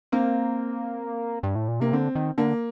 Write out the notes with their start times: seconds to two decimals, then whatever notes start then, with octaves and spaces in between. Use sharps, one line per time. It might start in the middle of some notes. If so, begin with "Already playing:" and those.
0.12 A#3 C4
1.43 G2
1.55 A2
1.68 A#2
1.80 C3 A#3
1.93 D3 C4
2.15 D#3
2.38 D3 A#3